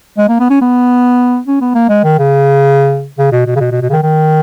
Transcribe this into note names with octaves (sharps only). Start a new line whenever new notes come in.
G#3
A#3
B3
C#4
B3
C#4
B3
A#3
G#3
D#3
C#3
C#3
B2
B2
C#3
B2
B2
B2
C#3
D#3
D#3